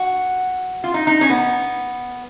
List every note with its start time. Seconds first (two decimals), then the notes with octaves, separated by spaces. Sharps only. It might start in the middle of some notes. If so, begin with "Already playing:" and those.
Already playing: F#4
0.84 F4
0.94 D#4
1.07 D#4
1.21 C#4
1.30 B3